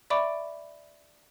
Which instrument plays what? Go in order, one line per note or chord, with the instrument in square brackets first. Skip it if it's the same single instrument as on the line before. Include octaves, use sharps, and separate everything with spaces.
[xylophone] D5 E5 B5 C#6 D6 D7